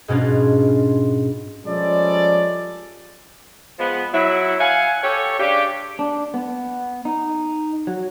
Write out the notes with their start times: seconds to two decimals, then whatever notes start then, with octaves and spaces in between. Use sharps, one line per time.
0.08 G#2 B2 C#4 D4 F4
1.66 F3 G3 G#3 C#4 A4 D5
3.79 F3 G#3 B3
4.13 F#3 E4
4.60 F5 F#5 G#5
5.03 G4 A4 C#5
5.39 C#3 D4 G4
5.99 D4
6.34 B3
7.05 D#4
7.87 F#3